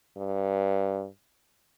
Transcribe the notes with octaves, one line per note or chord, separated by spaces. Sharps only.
G2